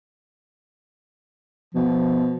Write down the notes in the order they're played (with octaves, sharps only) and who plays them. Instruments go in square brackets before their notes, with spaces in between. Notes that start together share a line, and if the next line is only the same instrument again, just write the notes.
[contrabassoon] B2 [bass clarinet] F3